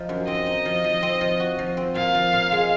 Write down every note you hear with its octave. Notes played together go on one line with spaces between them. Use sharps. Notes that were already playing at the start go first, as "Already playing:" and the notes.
Already playing: F3 D#4
F#2
C4 D#5
D#4
F3
F3
C4
F3
F#4
F3
C4
A#2 F5
F3
A#2
G#3